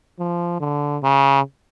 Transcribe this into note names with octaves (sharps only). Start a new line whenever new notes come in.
F3
D3
C#3